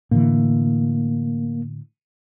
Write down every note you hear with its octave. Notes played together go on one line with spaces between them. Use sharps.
A2 D3 E3 A#3